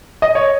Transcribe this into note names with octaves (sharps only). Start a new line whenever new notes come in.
D#5
C#5